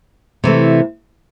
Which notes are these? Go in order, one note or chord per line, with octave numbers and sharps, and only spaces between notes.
C3 E3 A3